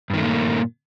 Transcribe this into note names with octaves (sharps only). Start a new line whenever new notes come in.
G2 A#2 D#3 A3 A#3